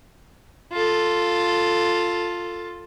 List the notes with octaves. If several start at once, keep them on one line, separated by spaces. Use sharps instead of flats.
F4 A4